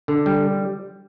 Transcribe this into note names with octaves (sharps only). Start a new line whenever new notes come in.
D3
G3